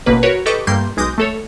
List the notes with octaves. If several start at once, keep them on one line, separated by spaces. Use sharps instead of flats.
A1 B2 A#3 B4
F#4 A#4 B4 C#5
G4 A4 B4 D#5 C#6 D6
G2 G3 A3 A#3 C6 G6
B1 G#3 D6 D#6 G6 A#6
A3 A4 C#5